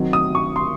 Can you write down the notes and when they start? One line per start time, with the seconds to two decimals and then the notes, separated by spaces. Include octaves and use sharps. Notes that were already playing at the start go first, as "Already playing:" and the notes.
Already playing: D#3 F#3 C4
0.13 D#6
0.35 C#6
0.56 C6